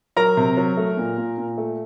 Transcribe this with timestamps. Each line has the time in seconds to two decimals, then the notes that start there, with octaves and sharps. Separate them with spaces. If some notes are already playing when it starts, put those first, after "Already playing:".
0.16 F#3 A#4 A#5
0.37 C3
0.57 F#3
0.77 A3
0.97 A#2
1.18 A#2
1.38 A#2
1.58 A3